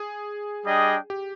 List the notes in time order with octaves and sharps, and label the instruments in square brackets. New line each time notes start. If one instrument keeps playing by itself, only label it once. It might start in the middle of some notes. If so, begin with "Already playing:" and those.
Already playing: [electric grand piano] G#4
[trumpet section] G3 D4 G#4 D#5 G5
[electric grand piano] G4